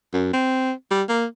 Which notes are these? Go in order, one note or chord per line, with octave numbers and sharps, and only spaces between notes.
F#2
C4
G3
A#3